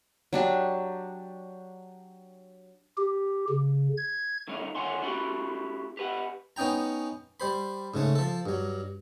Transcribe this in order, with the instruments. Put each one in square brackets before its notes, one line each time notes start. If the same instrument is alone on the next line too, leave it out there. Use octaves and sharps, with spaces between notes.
[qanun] F#3 D4 G4
[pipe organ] G4
C#3
G#6
[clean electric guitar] D3 D#3 G3 C#4 D#4
D3 D#3 C#5 F#5 G#5 C6
C#4 E4 F#4 G4 B5 C6
G4 B4 F#5
[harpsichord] B3 C#4 D#4 G5 A#5
G3 C5 B5
G#2 C#3 A3
F3 A4
G2 F#3